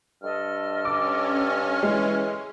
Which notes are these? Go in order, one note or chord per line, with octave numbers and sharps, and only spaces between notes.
G2 A4 D#5 F6
C#4 D6
E3 G#3